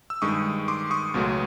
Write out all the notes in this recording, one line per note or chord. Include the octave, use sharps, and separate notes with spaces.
E6
G2 D#3 G#3 C#6 D#6
C6 D6
C#6 D#6
C#2 B2 F#3 A3